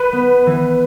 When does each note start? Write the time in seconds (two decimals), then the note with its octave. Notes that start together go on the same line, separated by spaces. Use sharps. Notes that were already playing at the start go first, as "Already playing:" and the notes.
Already playing: B4
0.12 B3
0.46 E3